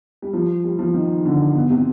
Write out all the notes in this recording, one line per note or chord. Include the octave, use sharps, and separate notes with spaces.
G3
F3
G3
F3
D#3
D3
B2
C3